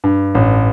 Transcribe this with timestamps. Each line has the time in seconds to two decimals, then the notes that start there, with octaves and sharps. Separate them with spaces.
0.04 G2
0.35 A1